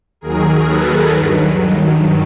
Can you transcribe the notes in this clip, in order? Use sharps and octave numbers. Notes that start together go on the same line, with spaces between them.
D#2 D#3 F#3 G#4 A#4
A4 B4
G2 D#3 F#3